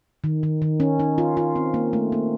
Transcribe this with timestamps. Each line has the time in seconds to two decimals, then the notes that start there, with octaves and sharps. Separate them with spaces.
0.24 D#3
0.43 D#3
0.62 D#3
0.80 C#4
0.99 D#4
1.18 F4
1.37 F4
1.56 C4
1.74 A#3
1.93 A3
2.12 A#3